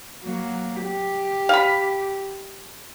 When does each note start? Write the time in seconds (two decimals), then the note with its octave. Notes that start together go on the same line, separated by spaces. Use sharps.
0.23 F#3 A#3
0.82 G4
1.49 F5 B5